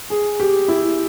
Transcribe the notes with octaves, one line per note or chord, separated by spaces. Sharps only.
G#4
G4
E4